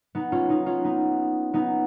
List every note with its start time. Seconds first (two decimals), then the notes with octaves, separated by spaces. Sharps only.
0.15 B3 D#4
0.32 C#4 F4
0.49 B3 D#4
0.66 C#4 F4
0.84 B3 D#4
1.54 B3 D#4